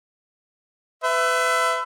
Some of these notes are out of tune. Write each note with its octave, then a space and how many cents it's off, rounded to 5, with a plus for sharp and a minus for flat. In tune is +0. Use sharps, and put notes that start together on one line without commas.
B4 +35 E5 +10